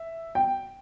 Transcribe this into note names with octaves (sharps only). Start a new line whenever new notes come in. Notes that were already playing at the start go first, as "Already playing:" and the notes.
Already playing: E5
G5